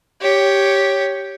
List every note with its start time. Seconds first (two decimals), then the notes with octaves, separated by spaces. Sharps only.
0.22 G4 C#5